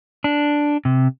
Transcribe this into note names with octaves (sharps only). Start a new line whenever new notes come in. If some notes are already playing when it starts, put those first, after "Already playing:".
D4
C3